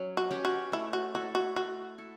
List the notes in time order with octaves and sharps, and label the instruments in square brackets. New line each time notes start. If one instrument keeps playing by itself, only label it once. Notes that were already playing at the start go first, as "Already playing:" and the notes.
Already playing: [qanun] F#3 C#4
[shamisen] F#4
[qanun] C#4 G4 B4
[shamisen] F#4
[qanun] A3 [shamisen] E4
[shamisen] F#4
[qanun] E4 A4 [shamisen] F#4
[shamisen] F#4
[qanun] A3 [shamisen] F#4
[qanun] E4 A4